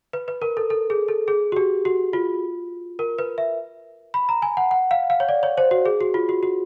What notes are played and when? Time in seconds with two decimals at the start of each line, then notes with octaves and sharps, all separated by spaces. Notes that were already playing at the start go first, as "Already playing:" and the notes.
0.13 B4
0.28 B4
0.42 A#4
0.57 A4
0.70 A4
0.90 G#4
1.08 A4
1.28 G#4
1.52 F#4
1.56 G4
1.85 F#4
2.13 F4
2.99 A#4
3.19 B4
3.38 E5
4.14 B5
4.29 A#5
4.42 G#5
4.57 F#5
4.71 F#5
4.91 F5
5.10 F5
5.20 C#5
5.29 D5
5.43 C#5
5.58 C5
5.71 F#4
5.86 G#4
6.01 F#4
6.14 F4
6.29 F#4
6.43 F#4